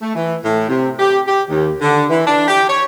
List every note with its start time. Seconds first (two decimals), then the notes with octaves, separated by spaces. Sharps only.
0.02 A3
0.15 E3
0.45 A2
0.69 C3
0.99 G4
1.27 G4
1.50 D#2
1.81 D3
2.09 E3
2.26 D4
2.48 G4
2.68 C#5